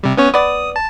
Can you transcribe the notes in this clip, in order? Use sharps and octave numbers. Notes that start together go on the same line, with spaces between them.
C3 G3
B3 C#4 C#5
B3 D5 D#6
A5